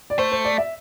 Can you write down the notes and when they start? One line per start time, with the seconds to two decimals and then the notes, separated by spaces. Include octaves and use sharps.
0.10 D5
0.18 A3 C5
0.32 C5
0.45 D5
0.58 E5